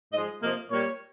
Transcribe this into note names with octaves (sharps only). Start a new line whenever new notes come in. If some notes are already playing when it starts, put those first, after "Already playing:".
G#2 F3 G#3 D#5
C3 F3 A#3 D#5
A#2 G3 A#3 C#5